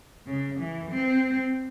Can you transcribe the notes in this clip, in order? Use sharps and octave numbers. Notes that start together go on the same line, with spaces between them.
C#3
E3
C4